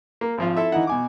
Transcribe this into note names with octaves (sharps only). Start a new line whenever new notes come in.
A#3
G#1 F3 F4
E4 A4 E5
E3 D#4 E4 F#5
B2 G#5 D6